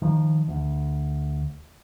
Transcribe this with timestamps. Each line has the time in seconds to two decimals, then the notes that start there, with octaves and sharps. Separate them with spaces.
0.02 D#3 F3
0.48 D2